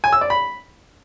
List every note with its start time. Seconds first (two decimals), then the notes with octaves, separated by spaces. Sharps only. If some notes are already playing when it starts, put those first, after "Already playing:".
0.04 G#5
0.13 E6
0.21 D5
0.30 B5